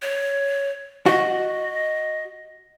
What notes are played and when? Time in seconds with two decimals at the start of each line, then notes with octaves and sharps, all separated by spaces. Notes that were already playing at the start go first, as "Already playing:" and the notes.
0.02 C#5
1.06 F#4 D#5